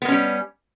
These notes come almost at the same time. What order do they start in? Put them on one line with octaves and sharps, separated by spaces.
B3 A#3 C#4 G3